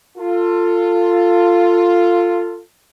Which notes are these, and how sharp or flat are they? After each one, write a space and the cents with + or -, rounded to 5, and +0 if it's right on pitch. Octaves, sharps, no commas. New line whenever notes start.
F4 +0 A4 +25